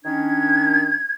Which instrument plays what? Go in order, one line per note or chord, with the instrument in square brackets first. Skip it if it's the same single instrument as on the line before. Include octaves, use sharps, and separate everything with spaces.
[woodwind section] D#3 C#4 D4 [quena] G#6